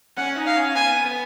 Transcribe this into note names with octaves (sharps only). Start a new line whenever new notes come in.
C#4 F#5
D#4
F5
C#4
B3 G#5
B3